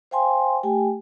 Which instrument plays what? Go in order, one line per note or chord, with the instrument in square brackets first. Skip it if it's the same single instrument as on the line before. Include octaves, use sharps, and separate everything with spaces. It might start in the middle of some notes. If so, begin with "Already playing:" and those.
[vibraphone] C5 F5 G5 G#5 C6
A3 G4 G5 G#5